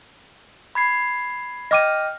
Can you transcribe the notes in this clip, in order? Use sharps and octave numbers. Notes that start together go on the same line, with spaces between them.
B5 G#6 C7
D#5 G5 D6 F6 A#6 D#7